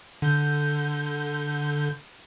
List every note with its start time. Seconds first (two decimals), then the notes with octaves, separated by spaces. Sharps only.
0.22 D3 G6